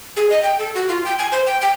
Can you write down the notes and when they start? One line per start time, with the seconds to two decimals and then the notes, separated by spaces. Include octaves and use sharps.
0.17 G#4
0.30 D#5
0.43 G5
0.59 A4
0.75 F#4
0.89 F4
1.05 G5
1.19 G#5
1.32 C5
1.46 G5
1.61 G5